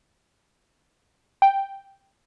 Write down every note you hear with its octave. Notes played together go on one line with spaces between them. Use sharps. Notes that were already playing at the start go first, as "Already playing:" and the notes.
G5